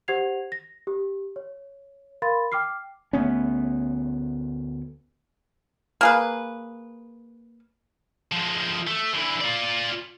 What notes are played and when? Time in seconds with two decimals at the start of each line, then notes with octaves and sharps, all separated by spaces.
0.08 G4 C5 F#5 G#6 C7 F7
0.52 A#6
0.87 G4
1.36 C#5
2.22 A#4 F5 B5 C6 A6
2.52 G5 D6 F6 C7
3.13 D2 A3 B3 C#4
6.01 A#3 G#4 B4
8.32 F3 G#3
8.87 A3
9.14 D3 E3
9.41 F4 D5